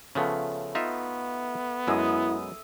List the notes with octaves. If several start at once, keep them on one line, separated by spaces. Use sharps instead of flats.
C#3 F3 A3 B3
B3 D#4 F4 E5
F#2 G#3 E4 D#6 E6